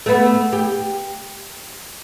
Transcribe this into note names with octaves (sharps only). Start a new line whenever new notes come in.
A3 B3
G4